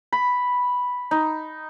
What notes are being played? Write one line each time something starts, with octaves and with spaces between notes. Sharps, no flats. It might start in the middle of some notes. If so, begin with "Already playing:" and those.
B5
D#4